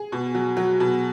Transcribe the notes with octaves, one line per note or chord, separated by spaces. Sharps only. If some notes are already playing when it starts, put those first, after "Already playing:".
Already playing: G#4
B2
F#3
F#3
B2